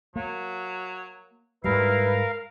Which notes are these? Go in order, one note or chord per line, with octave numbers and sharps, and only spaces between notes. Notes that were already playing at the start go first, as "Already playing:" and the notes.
F#3 A#3
G#2 G3 E4 A#4 B4 F5